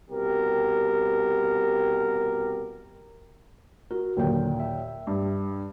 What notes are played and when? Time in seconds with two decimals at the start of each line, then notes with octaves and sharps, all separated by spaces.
0.10 C2 B2 G4 A#4
3.91 F#4 A#4
4.17 D#2 A#2 D3 F#3 A#3 G5
4.60 E5
5.07 G2